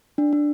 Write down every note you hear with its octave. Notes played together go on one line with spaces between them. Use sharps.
D4
D4